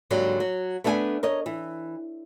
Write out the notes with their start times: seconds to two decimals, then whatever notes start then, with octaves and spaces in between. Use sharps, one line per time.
0.10 G#2 D3 F#3 G3 A#3
0.40 F#3
0.84 A3 B3 D4 F#5 G#5
1.23 A#4 C#5 D#5
1.46 E3